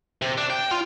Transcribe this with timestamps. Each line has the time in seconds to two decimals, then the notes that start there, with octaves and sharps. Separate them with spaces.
0.22 C3
0.38 D4
0.50 G5
0.71 F4